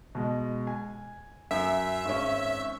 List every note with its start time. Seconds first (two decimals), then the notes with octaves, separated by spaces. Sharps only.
0.15 B2 G#3
0.67 G#5
1.51 F#2 E5
2.05 G#1 C#4